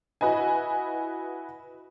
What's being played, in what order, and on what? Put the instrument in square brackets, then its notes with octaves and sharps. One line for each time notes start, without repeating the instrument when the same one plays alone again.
[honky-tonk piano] E4 F#4 B4 D#5 G#5